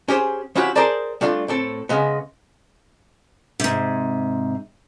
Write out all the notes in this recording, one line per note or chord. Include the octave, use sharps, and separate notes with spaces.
C#4 G4 G#4 C5
F3 C#4 E4 F#4 G4
G#4 A#4 C5 D5 A5
G3 A3 D4 F4
A2 C4 A4
C#3 G#3 B3
G#2 C3